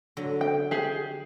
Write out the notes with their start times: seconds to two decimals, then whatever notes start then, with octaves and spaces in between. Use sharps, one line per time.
0.17 D3 F#3
0.41 G5
0.71 G4 G#4